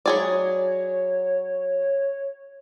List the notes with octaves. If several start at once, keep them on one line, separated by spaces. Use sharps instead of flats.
F#3 G#4 C#5 D5